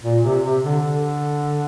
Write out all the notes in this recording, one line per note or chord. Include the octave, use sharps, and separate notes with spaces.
A#2
C3
C3
D3
D3